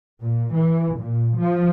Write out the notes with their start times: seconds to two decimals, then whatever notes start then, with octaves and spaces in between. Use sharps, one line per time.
0.23 A#2
0.55 E3
0.98 A#2
1.39 F3